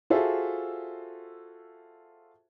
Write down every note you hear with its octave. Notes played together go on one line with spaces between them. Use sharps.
F4 F#4 G#4 A4 C5 E5